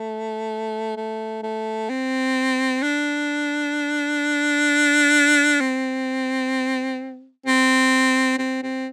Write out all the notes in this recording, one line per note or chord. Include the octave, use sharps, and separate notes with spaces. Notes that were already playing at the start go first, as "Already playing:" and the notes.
Already playing: A3
A3
A3
C4
D4
C4
C4
C4
C4